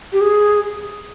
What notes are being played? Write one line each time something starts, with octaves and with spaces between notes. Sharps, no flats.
G4
G#4